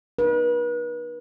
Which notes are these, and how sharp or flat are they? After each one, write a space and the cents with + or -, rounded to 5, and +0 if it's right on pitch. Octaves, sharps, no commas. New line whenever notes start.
D#4 -30 B4 -40